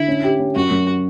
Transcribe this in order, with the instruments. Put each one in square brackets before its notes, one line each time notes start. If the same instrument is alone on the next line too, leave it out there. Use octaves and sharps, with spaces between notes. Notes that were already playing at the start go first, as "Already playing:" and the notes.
Already playing: [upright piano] D3 [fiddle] E4
[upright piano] C#4
G4
C#4
[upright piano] F#2 [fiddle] F#4
[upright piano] F#2